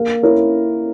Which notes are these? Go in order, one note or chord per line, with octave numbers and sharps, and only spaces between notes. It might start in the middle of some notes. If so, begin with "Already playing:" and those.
Already playing: A#3
E4 A#4 C#5